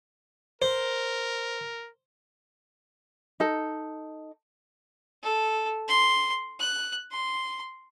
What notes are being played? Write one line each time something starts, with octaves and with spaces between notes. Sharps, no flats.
A#4 C5
D#4 A4
A4
C6
F#6
C6